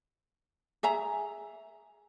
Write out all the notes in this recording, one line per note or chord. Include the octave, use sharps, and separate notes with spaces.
G#4 E5 A#5